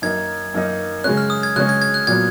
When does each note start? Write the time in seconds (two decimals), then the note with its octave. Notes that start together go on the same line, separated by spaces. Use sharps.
0.02 F#2 D#3 A#3 D#4 G#6
0.54 F#2 D#3 A#3 D#4
1.04 C#3 G#3 C#4 F#6
1.17 F6
1.30 D#6
1.43 G#6
1.56 C#3 G#3 C#4 F#6
1.69 G#6
1.82 G#6
1.94 F#6
2.07 A#2 F#3 B3 G#6